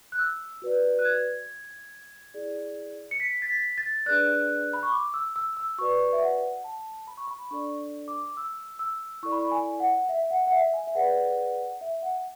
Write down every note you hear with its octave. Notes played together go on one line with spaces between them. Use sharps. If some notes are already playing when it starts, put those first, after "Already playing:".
F#6
E6
F#4 B4 D5
F#6
G#6
E4 G#4 D5
C#7
B6
A6
B6
A6
D4 G#4 B4 D5 F#6
B5
C#6
D6
E6
E6
E6
F#4 B4 D5 C#6
E5
F#5
A5
B5
C#6
B5
D4 A4 D5 C#6
D6
E6
E6
E4 A4 D5 C#6
B5
C#6
G#5
F#5
E5
F#5
F#5
E5
G#5
E5
G#4 B4 D5 F#5
E5
F#5